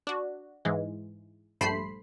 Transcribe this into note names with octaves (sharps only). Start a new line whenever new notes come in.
D4 F#4
G#2 E3 G#3
A#1 G2 A3 C5 B5 C7